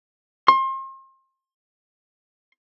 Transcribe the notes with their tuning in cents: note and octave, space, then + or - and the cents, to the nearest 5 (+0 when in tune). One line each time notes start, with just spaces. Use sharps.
C6 +35